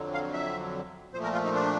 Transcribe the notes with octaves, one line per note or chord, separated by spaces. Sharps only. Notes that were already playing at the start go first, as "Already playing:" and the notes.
Already playing: F2 D3 F#3
F5
E5
A#2 F3 A3 C5
A#4
F4
D#4
D4